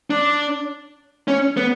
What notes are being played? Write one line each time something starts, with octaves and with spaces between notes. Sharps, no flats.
D4
C#4
B3